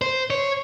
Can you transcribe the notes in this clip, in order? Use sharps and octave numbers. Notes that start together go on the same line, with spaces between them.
C5
C#5